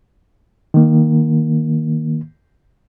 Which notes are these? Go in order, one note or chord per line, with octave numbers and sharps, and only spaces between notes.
D#3 A#3